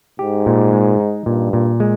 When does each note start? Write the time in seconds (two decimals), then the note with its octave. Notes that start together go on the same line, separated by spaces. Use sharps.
0.19 G#2 G4
0.46 A#2
0.73 G#3
1.00 D#4
1.26 G2 A#2
1.53 A#2
1.80 G#3